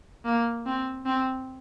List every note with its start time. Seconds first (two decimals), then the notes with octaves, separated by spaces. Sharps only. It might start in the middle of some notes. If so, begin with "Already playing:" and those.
0.25 A#3
0.66 C4
1.06 C4